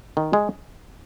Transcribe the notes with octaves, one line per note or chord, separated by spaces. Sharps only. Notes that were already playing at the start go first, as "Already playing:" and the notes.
D#3
G#3